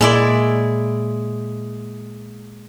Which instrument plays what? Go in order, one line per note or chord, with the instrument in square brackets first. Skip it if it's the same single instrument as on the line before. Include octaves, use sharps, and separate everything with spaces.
[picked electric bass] A#2 [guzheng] G#3 E4 D5